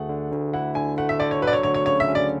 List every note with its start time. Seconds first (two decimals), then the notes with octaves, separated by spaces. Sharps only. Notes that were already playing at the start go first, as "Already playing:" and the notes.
Already playing: D2 A3 G#4 F#5
0.09 D3
0.32 D2
0.54 E4 F#5
0.75 D3 G#5
0.98 A3 F#5
1.09 E5
1.20 D3 D5
1.31 C#5
1.42 F#3 B4
1.47 D5
1.53 C#5
1.63 D2 C#5
1.74 C#5
1.86 C#3 C#5
2.00 E5
2.08 C#4
2.15 D5